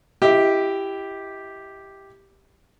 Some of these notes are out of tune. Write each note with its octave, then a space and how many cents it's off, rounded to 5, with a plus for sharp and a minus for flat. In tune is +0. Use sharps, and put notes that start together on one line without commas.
E4 +20 G4 +0 D#5 +40